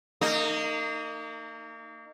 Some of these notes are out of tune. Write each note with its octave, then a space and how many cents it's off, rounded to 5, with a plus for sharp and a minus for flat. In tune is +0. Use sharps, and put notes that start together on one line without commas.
A#3 -35 D#4 -15